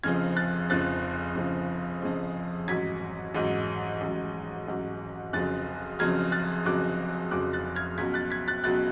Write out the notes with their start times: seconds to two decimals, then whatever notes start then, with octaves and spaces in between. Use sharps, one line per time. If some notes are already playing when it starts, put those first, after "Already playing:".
0.03 F1 F2 C#3 F3 F6 G#6
0.36 F#6 A6
0.70 F1 F2 C#3 F3 F#6 A6
1.36 F1 F2 C#3 F3
2.02 F1 F2 C#3 F3
2.68 A1 G#2 F#3 G#6 B6
3.35 A1 G#2 F#3
4.01 A1 G#2 F#3
4.68 A1 G#2 F#3
5.33 F1 F2 C#3 F#3 F#6 A6
5.99 F1 F2 C#3 F#3 F6 G#6
6.32 F#6 A6
6.65 F1 F2 C#3 F#3 D6 F#6
7.31 F1 F2 C#3 F#3 D6 F#6
7.53 F#6 A6
7.76 F6 G#6
7.98 C#2 B2 F#3 G#6 B6
8.14 F#6 A6
8.30 G#6 B6
8.48 F#6 A6
8.64 C#2 B2 F#3 F#6 A6